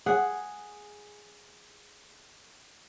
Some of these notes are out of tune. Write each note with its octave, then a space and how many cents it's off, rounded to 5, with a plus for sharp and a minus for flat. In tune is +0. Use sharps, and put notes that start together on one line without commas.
G#4 +0 F#5 +0